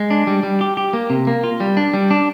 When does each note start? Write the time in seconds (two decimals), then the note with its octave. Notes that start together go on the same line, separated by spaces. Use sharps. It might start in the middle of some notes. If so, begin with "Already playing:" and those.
Already playing: G#3
0.11 D4
0.27 G3
0.43 G3
0.61 G4
0.77 G4
0.93 A#3
1.10 C3
1.27 A#3
1.44 F4
1.60 G3
1.77 D4
1.94 G3
2.11 D4